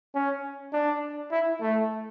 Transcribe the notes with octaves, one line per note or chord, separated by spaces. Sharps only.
C#4
D4
E4
A3